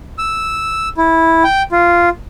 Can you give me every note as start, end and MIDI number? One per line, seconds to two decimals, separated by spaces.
0.18 0.89 88
0.97 1.43 64
1.44 1.62 79
1.72 2.09 65